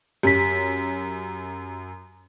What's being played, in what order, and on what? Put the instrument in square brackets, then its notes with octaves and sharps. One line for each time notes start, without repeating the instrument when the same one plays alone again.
[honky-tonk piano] F#2 [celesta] G4 B6